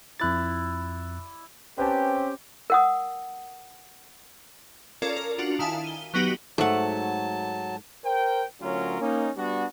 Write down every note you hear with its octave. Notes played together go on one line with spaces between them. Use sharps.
F2 E4 D5 F#6 A6
C4 C#4 G4 B4 G#5 A5
A#4 F#5 D#6
C#4 F4 A4 A#4 D5
A#4
D4 F4 F#4
D#3 E4 F5 G#5 A5
D#7 G7
F#3 B3 D#4 F#4 G4
G#2 F#3 A3 F#5 A5
A#4 C5 G5
D2 F#3 C#4 F4 A#4
A#3 C#4 D#4
G3 B3 D4 F#4